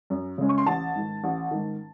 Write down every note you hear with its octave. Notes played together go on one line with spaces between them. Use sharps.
F#2
C#3 G#3 C#4
C#6
C6
A1 A5
G#2 D#3
A1
G#2 D#3